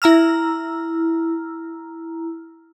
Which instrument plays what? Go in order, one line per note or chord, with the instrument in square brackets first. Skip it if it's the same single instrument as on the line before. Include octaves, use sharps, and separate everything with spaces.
[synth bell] E4 A#5 E6 F6